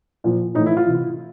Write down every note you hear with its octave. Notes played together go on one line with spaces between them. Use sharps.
A#2 F3
A2 D#4
E3
E4
F4
C3 E3